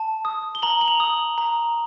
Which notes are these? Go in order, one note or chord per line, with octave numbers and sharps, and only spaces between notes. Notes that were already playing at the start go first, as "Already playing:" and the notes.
Already playing: A5
D#6
G7
A#5 F#7
F#7
F7
D#6
A#5